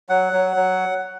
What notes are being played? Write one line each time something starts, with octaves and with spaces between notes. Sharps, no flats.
F#3 F#5
F#3
F#3